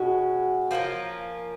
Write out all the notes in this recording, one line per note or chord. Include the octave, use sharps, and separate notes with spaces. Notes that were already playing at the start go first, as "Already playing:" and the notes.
Already playing: B2 G#3 C#4 F#4
F3 A#3 C#4 F4